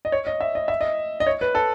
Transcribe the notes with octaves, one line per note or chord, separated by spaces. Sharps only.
D#5
C#5
D#5
E5
D#5
E5
D#5
D#5
C#5
B4
A4